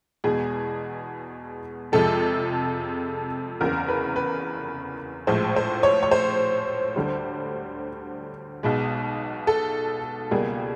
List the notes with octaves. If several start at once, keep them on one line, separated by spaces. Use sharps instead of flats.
E2 B2 G#3 G#4
F2 C3 F3 G#3 A4
F#1 E2 C#3 A#4
B4
B4
A#1 A2 F3 G#3 C5
C5
C#5
C#5
C5
D2 D3 G3
B1 B2 G#3
A4
C#2 B2 G3 A#3 G#4